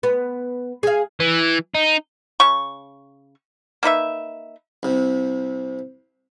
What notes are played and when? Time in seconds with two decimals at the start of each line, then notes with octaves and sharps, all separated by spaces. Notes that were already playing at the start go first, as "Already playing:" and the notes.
0.03 B3
0.83 G#4 F5
1.20 E3
1.75 D#4
2.40 C#3 C#6
3.83 A#3 D#4 B4 E5
4.83 C2 C3